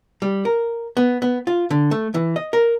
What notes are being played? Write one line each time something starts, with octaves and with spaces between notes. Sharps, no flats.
G3
A#4
B3
B3
F4
D3
A3
E3
D#5
A#4